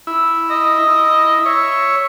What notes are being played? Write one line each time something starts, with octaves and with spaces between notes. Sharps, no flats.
E4
D#5
E4
C#5 E5